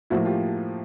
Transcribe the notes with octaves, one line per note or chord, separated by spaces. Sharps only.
A2 F3 A#3 E4 F#4
F4 G4